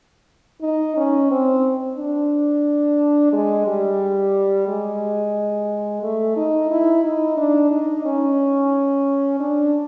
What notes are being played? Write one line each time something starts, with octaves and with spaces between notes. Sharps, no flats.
D#4
C#4
C4
D4
G#3
G3
G#3
A3
D#4
E4
D#4
D4
D#4
C#4
D4